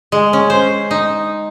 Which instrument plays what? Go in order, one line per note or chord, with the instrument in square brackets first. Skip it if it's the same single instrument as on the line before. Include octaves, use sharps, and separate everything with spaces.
[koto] G#3
C#4
C5
D#4